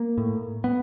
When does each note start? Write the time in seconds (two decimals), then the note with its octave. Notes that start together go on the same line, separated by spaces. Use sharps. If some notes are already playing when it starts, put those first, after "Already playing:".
Already playing: A#3
0.18 A2
0.64 B3